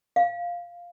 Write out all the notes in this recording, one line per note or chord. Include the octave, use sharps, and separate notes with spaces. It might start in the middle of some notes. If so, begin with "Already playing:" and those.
F5